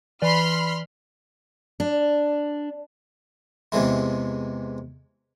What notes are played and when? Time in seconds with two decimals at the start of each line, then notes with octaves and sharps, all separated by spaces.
0.22 E3 B4 D5 B5 C6 F6
1.80 D4
3.72 E2 C3 E3 G#3 E4